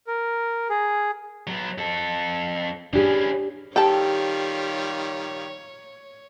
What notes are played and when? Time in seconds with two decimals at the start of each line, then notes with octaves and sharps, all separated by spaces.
0.07 A#4
0.69 G#4
1.47 F#3 B3
1.78 F2 A4
2.93 E3 C#4 D4 G4 G#4
3.76 D#3 G3 F4 G4 A4 C#5 G5 A5